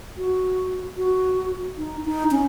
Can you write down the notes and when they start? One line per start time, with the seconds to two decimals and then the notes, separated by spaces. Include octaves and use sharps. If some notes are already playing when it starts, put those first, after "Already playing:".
0.18 F#4
0.98 F#4
1.78 D#4
2.05 D#4
2.31 C#4